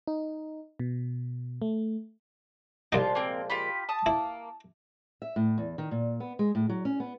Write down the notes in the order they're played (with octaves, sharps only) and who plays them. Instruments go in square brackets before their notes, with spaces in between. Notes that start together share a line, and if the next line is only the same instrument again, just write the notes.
[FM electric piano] D#4
B2
A3
[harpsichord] C2 D#4 [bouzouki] A#2 F3 G#3 [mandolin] F4
[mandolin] A#3 C4
F4 G4 B5
A5 D#6
[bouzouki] A#3 [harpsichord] E4
[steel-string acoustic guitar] E5
A2
E2
D#3
A#2
B3
G#3
A2
F#3
C#4
B3